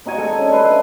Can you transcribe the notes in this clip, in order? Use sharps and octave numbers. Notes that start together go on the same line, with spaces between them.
C4 D#4 F#4 G#5
G#3 A4 G#5
C#4 D4
B4 G#5 C6
E5